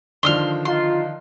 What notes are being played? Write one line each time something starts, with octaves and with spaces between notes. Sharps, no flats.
D3 D#3 F3 C6 D#6 F6
D#4 F4 C6